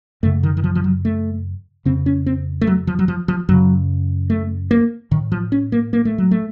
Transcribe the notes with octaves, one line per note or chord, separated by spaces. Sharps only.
F#2 C#3 A3
D#3
D#3
F3
F3
F#3
A3
F2 C#3 C4
C#4
C4
A3
F#3
F3
F#3
F3
F3
F#2 C#3 F#3
A3
A#3
A2 D#3
F3
C#4
A#3
A#3
A3
F#3
A3